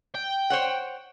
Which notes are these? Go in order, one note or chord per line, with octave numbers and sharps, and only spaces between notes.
G5
C5 C#5 F#5